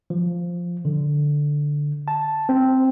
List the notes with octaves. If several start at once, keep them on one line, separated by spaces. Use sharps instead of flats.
F3
D3
A5
C4